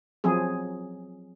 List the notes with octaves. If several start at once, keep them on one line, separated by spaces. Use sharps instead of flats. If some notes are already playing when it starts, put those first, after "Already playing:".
F3 F#3 C4 G#4